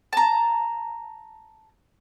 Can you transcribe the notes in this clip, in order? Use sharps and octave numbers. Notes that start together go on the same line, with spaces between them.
A5 A#5